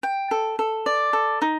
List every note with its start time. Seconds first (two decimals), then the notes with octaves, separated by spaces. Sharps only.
0.03 G5
0.31 A4
0.59 A4
0.86 D5
1.13 A4
1.42 D#4